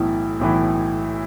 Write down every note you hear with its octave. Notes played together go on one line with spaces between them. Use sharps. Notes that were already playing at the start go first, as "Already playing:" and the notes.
Already playing: B1 A2 E3 E4
B1 A2 E3